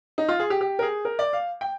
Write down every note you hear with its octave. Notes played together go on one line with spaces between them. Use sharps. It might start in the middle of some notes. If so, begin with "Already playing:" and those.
D#4
F4
G#4
G4
G4
A#4
G#4
A#4
D5
F5
G5